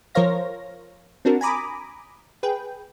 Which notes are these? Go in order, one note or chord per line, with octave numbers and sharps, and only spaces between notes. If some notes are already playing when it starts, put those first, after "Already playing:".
F3 A#4 C5 C#5 F5 A#6
C4 D4 F#4 A#4
G#5 A#5 B5 D6 D#6
G#4 B4 G5